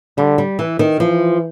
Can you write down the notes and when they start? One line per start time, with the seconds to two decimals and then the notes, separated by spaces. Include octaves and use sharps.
0.17 D3 G3
0.38 G3
0.59 E3
0.79 D#3
0.99 E3 F3